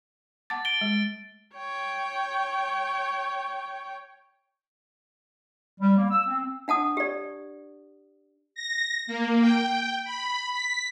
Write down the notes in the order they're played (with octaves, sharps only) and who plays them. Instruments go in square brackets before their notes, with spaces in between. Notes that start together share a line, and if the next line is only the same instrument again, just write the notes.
[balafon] F#5 A5 D6 [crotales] A6
[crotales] A6 D7 G7
[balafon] G#3
[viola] C#5 G5
[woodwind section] G3
A#3
E6
C4
[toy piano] D4 F#5 A5 D#6
G4 D5
[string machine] A#6
A#3
G5
B5
B6